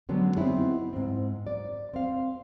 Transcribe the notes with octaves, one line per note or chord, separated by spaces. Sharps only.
D3 F#3 G#3 B3 C#4
B3 C4 D#4 E4 G#4
G#2 C4
D5
C4 F5